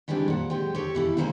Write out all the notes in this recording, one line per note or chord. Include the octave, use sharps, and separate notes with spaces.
D#3 E3 G3 G#3 C4 D4
A#2 F#5
G#3 C4 G4
G4 A4 C#5
B2 E3 E4
C#3 G#3 A#3 C5 F#5 G#5